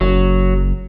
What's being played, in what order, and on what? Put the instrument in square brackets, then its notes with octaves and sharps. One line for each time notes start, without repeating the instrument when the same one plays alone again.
[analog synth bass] F#1 [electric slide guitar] F#3